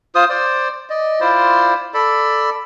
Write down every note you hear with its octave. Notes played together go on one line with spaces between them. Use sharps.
F4 C5 D#6
C5 D5
D5 D#5
E4 F4 C5 D5
A4 D5 B5